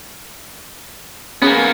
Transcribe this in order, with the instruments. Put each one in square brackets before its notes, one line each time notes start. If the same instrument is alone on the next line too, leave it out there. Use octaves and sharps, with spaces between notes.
[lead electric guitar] A#3 B3 [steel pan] C#4 G#4